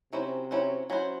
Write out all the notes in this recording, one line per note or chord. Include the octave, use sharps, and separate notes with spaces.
C3 F#3 C#4 E4 C5
F#3 C#4 E4 C5
F#3 C#4 E4 C5